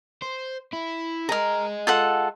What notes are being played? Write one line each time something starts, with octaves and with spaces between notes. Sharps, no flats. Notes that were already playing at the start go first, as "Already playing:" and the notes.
C5
E4
G#4 A#4 D#5 A#5
F4 A4 F#5